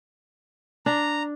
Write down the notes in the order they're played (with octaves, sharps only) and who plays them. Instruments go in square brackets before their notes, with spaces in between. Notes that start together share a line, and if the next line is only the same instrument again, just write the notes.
[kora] D4 [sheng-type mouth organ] A#5